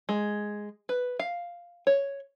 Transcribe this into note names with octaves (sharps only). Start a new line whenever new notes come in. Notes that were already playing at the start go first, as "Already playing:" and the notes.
G#3
B4
F5
C#5